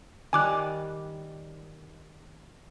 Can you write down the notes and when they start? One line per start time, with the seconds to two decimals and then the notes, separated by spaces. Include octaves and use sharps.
0.33 D#3 G3 G#5 D6 F#6